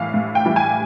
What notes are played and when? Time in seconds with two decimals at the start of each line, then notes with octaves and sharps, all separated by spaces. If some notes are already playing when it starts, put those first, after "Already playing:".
Already playing: A2 E3 G3 F5
0.14 A2
0.35 G5
0.45 E3 G3
0.56 G#5